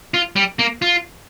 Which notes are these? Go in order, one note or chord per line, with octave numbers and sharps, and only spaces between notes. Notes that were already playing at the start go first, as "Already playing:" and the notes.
F4
G3
A#3
F4